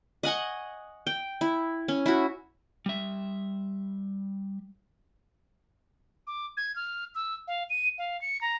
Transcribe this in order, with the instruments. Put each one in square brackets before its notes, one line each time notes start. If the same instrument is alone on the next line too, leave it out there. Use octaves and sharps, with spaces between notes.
[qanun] D#5 F#5 G#5 C#6
G5
E4
C#4
E4 F#4
[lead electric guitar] G3 E5
[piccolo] D6
G#6
F6
E6
F5
D#7
F5
C#7
A#5